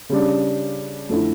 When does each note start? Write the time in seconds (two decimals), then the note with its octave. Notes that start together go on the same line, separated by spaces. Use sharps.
0.09 C#3 G3 D4
1.09 F2 D3 A3 E4